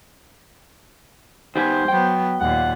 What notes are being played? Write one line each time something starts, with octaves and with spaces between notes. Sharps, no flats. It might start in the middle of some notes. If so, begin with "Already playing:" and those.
D#3 B3 G4 C5 G#5
F#3 B3 G5
D#2 A#2 F#5